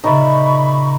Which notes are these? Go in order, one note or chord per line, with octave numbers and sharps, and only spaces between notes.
A#2 C#3 D#4 D5 E5 B5 C#6